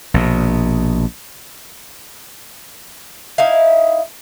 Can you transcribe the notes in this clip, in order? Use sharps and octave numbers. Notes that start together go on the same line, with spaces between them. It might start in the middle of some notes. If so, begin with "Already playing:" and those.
A#1 B2
D#4 E4 F5